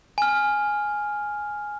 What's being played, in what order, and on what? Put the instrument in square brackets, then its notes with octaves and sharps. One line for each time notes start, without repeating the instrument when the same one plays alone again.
[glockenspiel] G#5 F6